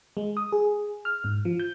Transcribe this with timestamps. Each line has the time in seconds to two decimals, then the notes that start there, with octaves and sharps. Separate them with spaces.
0.17 G#3
0.37 D#6
0.52 G#4
1.05 F6
1.24 G#2
1.45 F3
1.60 G6